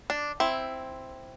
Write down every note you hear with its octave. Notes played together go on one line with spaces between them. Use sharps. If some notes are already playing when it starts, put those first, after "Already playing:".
D4
C4 E4